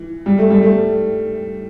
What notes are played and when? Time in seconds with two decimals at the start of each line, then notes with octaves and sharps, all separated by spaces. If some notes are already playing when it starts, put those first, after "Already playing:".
Already playing: E3
0.26 G3
0.38 A3
0.50 G3
0.63 A3